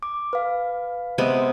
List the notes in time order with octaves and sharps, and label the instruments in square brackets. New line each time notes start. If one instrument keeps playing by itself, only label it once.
[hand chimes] D6
B4 F5
[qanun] C3 G#3 B3